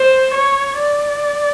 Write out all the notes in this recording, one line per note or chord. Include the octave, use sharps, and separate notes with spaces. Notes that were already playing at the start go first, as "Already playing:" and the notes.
Already playing: C5
C#5
D5